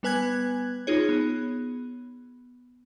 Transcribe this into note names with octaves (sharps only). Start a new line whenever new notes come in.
G3 B3 B4 G#5 F#6 G#6
D#4 F4 G#4 C#5
B3